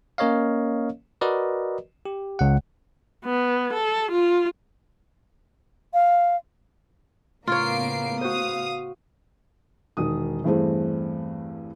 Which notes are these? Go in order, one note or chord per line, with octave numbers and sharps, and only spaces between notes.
A#3 C#4 A#4 C#5 D#5 F5
F#4 A#4 B4 D5 D#5
G4
C#2 F#5
B3
A4
F4
F5
A2 C#3 A#3 B3 F4 C#5 C7 D7
F#4 C5 F5 D#6
E1 D#3 D#6
E2 G2 E3 A3 C4 G#4